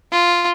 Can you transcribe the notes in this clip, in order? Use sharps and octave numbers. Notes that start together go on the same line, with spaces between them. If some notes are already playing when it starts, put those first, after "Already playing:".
F4